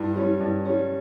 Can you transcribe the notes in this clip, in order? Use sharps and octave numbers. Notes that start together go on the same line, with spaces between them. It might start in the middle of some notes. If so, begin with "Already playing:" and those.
Already playing: G2 E4
G3 C#4
G2
G3 C#4